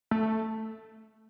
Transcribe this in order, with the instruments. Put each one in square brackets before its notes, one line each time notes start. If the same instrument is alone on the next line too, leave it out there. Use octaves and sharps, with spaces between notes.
[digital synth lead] A3